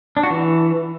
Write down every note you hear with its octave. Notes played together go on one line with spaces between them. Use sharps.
D4
F#4
E3